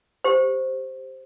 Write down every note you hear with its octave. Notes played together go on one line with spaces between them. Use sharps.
G4 C5